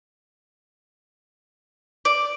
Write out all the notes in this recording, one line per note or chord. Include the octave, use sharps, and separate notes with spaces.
D5